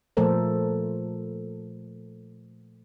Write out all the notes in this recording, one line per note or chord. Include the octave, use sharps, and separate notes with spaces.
A#2 F3 A3 A4 A#4 C5